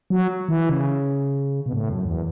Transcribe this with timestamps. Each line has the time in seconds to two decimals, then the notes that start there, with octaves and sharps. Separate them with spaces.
0.10 F#3
0.49 E3
0.69 C#3
1.66 B2
1.73 A2
1.89 F#2
2.05 E2